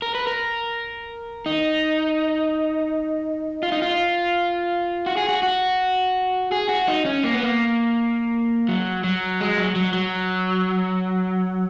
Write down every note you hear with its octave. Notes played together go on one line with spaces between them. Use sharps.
A#4
B4
A#4
D#4
F4
D#4
F4
F#4
G#4
F#4
F#4
G#4
F#4
D#4
C#4
A#3
B3
A#3
F#3
F#3
G#3
F#3
F#3
F#3